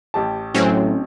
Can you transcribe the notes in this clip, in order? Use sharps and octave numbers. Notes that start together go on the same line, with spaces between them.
A1 G4 A5
A2 F#3 C4 C#4